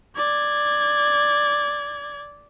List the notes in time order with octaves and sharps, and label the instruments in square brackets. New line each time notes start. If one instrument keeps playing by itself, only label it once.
[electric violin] D5 G#6